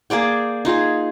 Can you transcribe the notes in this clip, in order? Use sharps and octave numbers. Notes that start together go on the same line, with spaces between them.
A#3 G#4 D5 G5
D#4 F4 G#4